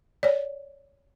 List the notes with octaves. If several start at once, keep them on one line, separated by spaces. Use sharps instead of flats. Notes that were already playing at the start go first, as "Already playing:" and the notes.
C#5 D5